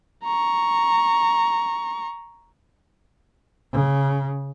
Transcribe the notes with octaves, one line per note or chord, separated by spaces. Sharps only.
A#5 C#6
C#3